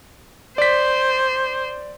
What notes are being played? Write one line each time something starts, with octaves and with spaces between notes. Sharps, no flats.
C5 D5 B6